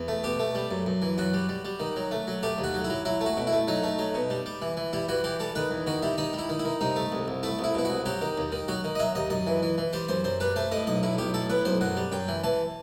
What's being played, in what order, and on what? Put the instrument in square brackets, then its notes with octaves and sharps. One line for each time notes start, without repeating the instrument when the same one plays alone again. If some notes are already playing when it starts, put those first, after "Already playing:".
Already playing: [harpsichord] E2
A3
B2 G4
A3
G3
F#2
F#2
E3
F#2 F#4
G3
G3
G3
D#3
F#3
A3
F#3
A3 G4
D#2
F#4
F#3
E4
F#3
F#3 E4
A3
F#4
B2
E4
A3
F#3 D#4
A3
F#3
B2
G3
G3
E3
E3
G3 E4
E3 F#4
E3 G4
G3 A4
D#3 B4
E2
D#3 F#4
G3 E4
D#3 D#4
G3
E4
D#3
E4
D#3
C2 D#4
A3
C2
C2
A3 E4
C2 E4
B2 E4
C2 F#4
F#3 G4
D#3
D#2
D#3
F#3 F#4
D#3
D#5
F#3 E5
D#2 D#5
F#2 D#5
E3
E3
E3
G3 C5
F#2 C5
F#2 C5
G3 B4
A3 C5
A2 D#5
B1 D#5
A2 E4
B1 G4
A2 A4
A2 B4
B1 C5
F#2 F#5
G3
F#2 G5
E3
E3 A5